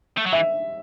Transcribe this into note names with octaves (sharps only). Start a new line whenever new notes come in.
A3
F#3
E3 E5